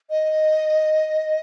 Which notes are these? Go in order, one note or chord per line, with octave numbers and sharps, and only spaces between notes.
D#5